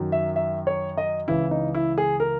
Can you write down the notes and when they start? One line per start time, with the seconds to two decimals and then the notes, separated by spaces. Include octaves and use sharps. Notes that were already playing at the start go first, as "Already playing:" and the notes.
Already playing: F#2 D#3 F#3
0.12 E5
0.36 E5
0.67 C#5
0.97 D#5
1.28 C#2 C#3 E3 E4
1.51 D#4
1.75 E4
1.98 G#4
2.20 A#4